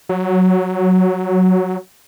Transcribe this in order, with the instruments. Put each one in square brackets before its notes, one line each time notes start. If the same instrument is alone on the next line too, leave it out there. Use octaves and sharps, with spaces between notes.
[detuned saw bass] F#3